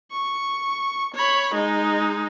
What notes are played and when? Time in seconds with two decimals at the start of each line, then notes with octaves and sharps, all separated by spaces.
0.11 C#6
1.14 C#5 B5
1.54 G#3 D#4